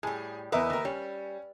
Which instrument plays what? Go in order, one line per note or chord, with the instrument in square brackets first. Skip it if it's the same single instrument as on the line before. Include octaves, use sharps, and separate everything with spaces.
[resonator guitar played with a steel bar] A2 G3 [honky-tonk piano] G#4
[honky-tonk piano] E2 A#4 [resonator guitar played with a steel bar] B4 D#5 E5
[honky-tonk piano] D#2 A#4
[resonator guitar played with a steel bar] G3 [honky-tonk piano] C#4